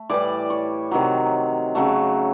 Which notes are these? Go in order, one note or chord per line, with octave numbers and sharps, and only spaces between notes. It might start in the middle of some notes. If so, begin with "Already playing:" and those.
Already playing: A3
A2 E3 G3 D5
C#5
C3 D#3 F#3
C#3 F#3 A3